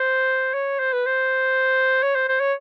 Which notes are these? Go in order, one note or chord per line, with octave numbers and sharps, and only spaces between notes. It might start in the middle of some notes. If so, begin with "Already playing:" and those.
Already playing: C5
C#5
C5
B4
C5
C#5
C5
C5
C#5